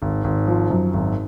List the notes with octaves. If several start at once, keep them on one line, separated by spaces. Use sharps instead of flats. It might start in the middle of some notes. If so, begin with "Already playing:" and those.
G#1
G#1
F3
F#2
G#1